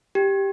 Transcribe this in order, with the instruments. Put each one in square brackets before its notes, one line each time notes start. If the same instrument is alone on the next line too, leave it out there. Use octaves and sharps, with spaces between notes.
[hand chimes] G4